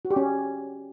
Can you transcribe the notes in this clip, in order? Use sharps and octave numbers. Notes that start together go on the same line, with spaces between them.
F#4
G4
C#4